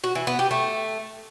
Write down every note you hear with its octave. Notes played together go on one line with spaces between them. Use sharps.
F#4
E3
B3
G4
A3